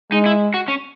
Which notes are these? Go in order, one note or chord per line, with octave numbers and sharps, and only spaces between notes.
G#3 D#4
E4
F#4
C#4